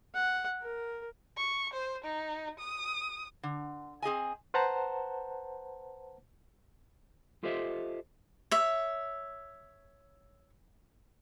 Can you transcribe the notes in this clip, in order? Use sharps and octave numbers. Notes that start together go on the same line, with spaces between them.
F#5
A#4
C#6
C5
D#4
D#6
D3
C4 G#4 D#5 G#5
B4 C5 F#5 A5 A#5
F4 G4 A4 C5 D#5 E5
C#5 E5